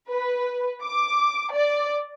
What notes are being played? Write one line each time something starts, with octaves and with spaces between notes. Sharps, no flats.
B4
D6
D5